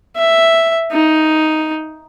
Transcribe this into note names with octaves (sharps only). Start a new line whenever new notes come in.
E5
D#4